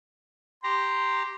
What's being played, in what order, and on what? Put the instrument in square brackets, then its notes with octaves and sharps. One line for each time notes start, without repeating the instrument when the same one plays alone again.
[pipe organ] G4 A#5 [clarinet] C6